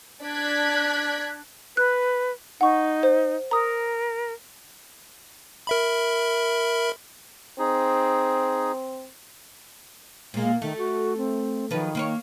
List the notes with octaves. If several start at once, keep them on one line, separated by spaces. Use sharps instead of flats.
D4 D5 F#6 G#6 B6
B4 F#6
D#4 F#5 C#6
C5
A#4 A#5 D#6
A#4 E5 B5
C4 D#4 G#4
A#2 G#3 A#3
D#3 A3
F#4
C4
D#3 F3 F#3 B4
A#3 B4 C#5